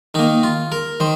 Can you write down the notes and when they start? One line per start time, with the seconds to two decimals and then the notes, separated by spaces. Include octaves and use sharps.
0.14 D#3 A#3 D#4
0.43 F4
0.72 A#4
1.00 D#3 C5